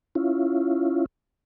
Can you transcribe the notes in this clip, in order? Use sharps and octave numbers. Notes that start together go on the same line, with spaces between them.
C#4 E4 F4